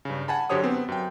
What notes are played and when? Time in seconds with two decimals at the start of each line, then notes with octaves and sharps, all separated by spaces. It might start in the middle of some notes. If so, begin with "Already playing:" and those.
0.05 G2 C#3
0.28 F#5 G#5 A5 B5
0.50 F#2 D3 G4 C5 C#5 D#6
0.63 B3 C4
0.88 F#2 G5